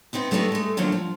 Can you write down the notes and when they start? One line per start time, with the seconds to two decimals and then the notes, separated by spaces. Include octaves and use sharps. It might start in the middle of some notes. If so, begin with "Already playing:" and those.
0.13 B3 C4 D#4 E4
0.31 F#3 A3 B3 D4 D#4 G4
0.52 G#3 A3
0.77 A2 D3 D#3 F3 F#3 A#3
0.92 F3